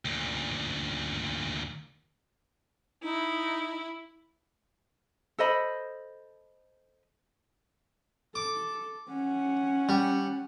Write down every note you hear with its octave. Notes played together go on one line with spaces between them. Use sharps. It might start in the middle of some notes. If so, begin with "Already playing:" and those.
D2 A#2
D#4 E4
A4 C5 D#5 B5
A4 D6
C#4 F#5
G3